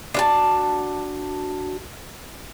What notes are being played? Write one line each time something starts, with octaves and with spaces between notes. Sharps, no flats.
D4 F#4 A5